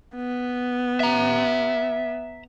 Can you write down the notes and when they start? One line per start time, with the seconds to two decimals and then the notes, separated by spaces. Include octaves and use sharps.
0.16 B3
1.00 E5 A#5